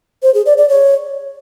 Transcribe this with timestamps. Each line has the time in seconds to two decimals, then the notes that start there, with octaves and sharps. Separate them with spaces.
0.23 C5
0.34 G#4
0.46 D5
0.58 D5
0.69 C#5